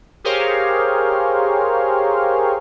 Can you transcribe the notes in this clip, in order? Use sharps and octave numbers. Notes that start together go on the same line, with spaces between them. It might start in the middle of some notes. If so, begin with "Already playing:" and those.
G4 G#4 A#4 C5 C#5 F5